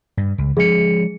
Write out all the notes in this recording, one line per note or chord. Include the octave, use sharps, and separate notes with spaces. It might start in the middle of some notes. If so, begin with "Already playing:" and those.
G2
C#2
F3 G#3 C#4 G#4 C#7